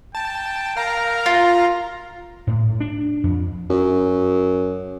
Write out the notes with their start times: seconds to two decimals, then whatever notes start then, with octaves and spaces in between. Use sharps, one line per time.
0.15 G5 A5
0.77 A#4 F5 A#5
1.26 F4
2.47 A2
2.80 D4
3.24 F2
3.70 F#2